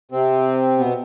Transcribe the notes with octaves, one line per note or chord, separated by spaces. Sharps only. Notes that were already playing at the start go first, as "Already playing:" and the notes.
C3 C4
B2 B3